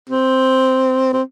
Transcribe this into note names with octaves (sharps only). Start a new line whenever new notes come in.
C4
C4